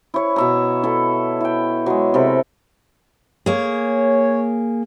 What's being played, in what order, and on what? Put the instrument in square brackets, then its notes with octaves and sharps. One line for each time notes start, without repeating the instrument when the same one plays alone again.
[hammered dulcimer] E4 C#5
B2 E5 A#5
E4 A4
E4 G5
F#3 G#3
C3 A4 A#4 B5
[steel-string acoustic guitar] A#3 G#4 [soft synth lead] C#5